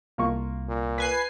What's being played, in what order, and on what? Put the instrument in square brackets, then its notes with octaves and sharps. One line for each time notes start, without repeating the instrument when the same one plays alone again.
[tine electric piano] C2 [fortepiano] A#3 F4 C#6
[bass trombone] A#2
[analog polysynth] B4 G#5 C7